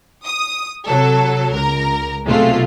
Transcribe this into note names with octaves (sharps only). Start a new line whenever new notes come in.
D#6
C3 F#3 A4
C#2 A#4 A#5
B1 C3 G#3 A3 F4